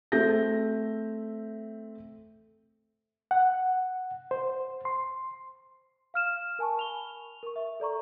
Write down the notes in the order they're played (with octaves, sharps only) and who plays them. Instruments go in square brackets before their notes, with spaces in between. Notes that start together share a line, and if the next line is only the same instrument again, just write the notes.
[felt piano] A3 C4 E5 G6 A#6
[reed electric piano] F#5
C5
C6
[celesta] F5 F6 E7
A#4 G#5 A5 C#6
B5 F7 G7
A#4 C#6
E5
A4 D5 A#5 C#6